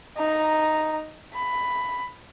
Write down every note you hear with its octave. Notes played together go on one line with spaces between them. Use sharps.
D#4 A#5
B5